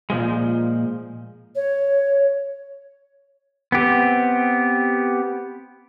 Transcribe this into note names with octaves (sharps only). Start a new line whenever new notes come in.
A#2 C#3 F3 G#3
C#5
B3 C4 G4